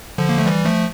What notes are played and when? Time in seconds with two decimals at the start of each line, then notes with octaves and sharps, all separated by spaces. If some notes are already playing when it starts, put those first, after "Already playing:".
0.18 D3 F3
0.29 A#3
0.38 A3
0.46 E3 G3
0.65 F3 A3